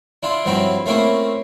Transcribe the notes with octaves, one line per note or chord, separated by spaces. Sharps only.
D4 E4 F4
G2 F3 F#3 C4 E4
A3 A#3 C4 C#4 E4